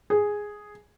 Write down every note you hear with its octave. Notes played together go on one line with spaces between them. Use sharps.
G#4